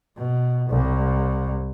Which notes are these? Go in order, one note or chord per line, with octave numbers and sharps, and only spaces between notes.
B2
C2